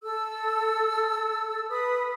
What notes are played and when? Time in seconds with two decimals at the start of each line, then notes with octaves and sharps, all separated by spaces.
0.03 A4 E6
1.69 B4 D#6